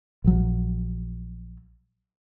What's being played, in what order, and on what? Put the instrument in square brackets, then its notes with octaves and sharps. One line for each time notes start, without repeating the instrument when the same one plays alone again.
[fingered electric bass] A#1 F#3